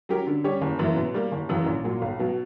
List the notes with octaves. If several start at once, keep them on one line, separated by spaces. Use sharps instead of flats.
F#3 C#4 G4 A#4
D3
G3 C#4 G4 C#5
F#1
F#2 E3 A#3 E4
B2
G3 A#3
F#1
F#2 C#3 E3
A#1
A#2 F#3
B1
B2 F#3